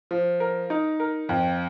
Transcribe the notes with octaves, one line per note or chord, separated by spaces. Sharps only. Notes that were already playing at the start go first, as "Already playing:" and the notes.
F3
A#4
D#4
A#4
F2